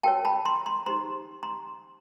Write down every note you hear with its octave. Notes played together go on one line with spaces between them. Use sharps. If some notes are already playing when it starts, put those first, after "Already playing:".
F#4 A#4 C#5 G5 A5
A5 B5
A#5 C6
A#5 C6
D#4 G4 C5 A#5 C6
A#5 C6